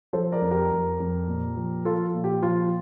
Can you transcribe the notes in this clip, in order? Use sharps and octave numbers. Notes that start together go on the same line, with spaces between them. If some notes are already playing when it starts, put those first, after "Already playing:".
F3 A4 C5
A#4 D5
F2
G4 A#4
F2
F2
A#2
F3
F3 F4 A4
A#2
G4
F3 F4